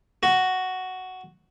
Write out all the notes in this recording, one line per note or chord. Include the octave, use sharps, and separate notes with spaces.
F#4